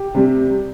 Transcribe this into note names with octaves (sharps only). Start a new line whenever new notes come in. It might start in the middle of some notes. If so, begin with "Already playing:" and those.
Already playing: G4
C3 G3